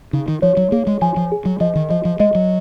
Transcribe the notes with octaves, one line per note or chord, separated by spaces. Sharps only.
C#3 D#4
D#3
F3 C#5
F#3
A#3 G#4
G#3
F3 G#5
F3
G#4
F#3
F3 D#5
D#3
F3 D#5
F3
G#3 D#5
F#3